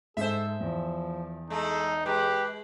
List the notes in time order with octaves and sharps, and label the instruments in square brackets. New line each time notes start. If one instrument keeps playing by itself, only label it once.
[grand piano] G#2 [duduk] A4 [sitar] C5 E5
[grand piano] E2 [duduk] F3
[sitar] G#3 A3 [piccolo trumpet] D#4 [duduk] A4
[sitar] G#3 [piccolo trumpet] G4 [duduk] B4